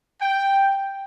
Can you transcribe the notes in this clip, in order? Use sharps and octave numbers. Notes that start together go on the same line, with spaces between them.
G5